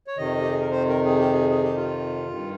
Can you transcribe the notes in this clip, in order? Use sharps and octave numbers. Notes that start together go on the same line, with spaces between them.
C#5
F2 C3 D#3 D#5
G4
G#4
A#4
C5
A#4
G#4
G4
G#4
G#4
G4
F4
G2 D#3